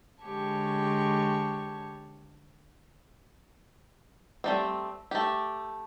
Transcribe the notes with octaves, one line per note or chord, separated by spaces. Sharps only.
D3 G#3 G4 C#5 A5 C#6
G3 A3 C4
A3 G4